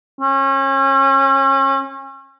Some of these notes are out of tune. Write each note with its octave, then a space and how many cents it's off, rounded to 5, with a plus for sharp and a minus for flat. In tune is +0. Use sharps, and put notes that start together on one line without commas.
C#4 -35